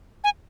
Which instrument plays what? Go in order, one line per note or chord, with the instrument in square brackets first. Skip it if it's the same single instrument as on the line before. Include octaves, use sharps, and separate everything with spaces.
[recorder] G#5